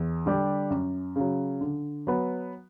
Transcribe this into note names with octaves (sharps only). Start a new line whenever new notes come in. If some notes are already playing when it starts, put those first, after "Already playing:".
Already playing: E2
D3 G3 D4 G4
F#2
C#3 F#3
D3
F#3 B3